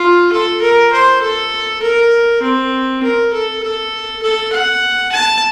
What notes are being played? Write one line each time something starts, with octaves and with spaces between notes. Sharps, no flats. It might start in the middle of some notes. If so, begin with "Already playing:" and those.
Already playing: F4
A4
A#4
C5
A4
A#4
C4
A#4
A4
A4
A4
F#5
A5